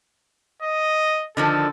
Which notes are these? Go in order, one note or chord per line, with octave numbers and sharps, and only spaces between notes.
D#5
D3 D#3 F3 A4